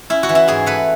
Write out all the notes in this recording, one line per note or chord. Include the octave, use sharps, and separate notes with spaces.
C#4 E4
F#4
E3
E4
G#2 G#4
A3 B4